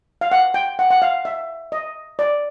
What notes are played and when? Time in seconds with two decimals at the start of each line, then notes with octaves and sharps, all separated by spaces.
0.21 F5
0.32 F#5
0.54 G5
0.79 F#5
0.91 F#5
1.02 F5
1.25 E5
1.72 D#5
2.19 D5